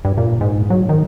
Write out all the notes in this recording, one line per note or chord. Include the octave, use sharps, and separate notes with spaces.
G2
A#2
G#2
F#3
D#3